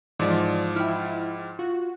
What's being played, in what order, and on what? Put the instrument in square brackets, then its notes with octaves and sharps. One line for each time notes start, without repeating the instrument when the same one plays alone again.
[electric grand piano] G#2 F3 [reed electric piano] E3 [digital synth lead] D5
[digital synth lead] E4 [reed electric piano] G5 F6
[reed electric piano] F4 [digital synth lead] F#4